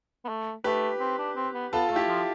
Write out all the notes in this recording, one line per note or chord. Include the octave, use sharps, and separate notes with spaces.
B3
A3
A3 G4 B4
C4
D4
C4
B3
B3 F4 A4
A3 A4
E4 G4
F3